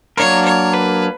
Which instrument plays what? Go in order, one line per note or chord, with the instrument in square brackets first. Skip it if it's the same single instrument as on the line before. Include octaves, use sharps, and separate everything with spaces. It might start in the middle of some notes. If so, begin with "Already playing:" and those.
[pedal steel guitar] F#3 A#3 D4 A#4 [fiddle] C#5
[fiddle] C#5
B4